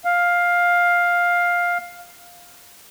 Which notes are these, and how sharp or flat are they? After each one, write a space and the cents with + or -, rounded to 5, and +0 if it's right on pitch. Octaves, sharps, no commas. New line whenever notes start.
F5 +10